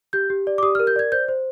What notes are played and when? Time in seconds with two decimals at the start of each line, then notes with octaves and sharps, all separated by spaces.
0.13 G4 G6
0.30 G4
0.47 D5
0.58 D6
0.63 G4 D#6
0.75 F6
0.79 A#4
0.87 G6
0.96 D5 G#6
1.12 C5 G6
1.28 C5